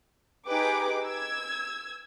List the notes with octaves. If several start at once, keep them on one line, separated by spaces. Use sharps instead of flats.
D#4 G4 G#4 B4 D6
E6 G#6